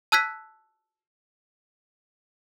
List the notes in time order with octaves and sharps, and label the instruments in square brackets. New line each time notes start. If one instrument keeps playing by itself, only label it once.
[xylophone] A5 E6 F#6 G#6 B6